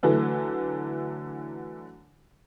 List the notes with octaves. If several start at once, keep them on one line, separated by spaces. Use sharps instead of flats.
D3 E3 F#3 A3